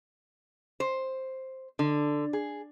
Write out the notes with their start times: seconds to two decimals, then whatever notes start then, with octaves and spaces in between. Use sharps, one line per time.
0.80 C5
1.79 D3
2.33 G#4